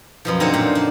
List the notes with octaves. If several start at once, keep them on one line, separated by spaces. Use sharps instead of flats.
F#2 B2 F3
D3 C4 D#4 A#4 C#5
A#2
D4